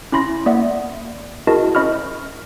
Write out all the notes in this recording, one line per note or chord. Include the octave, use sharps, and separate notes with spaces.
C#4 E4 B5 C6 A#6
A#3 D5 E5 F#5
E4 F#4 G#4 A#4 D#5 A5
C#4 C5 D#5 B5 C#6 F6